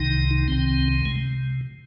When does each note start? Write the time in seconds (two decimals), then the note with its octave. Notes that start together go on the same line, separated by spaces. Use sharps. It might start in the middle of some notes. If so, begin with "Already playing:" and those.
Already playing: C2 C3 D#3 D#4
0.48 C2 C3 D#3 C4
1.05 C3 G#3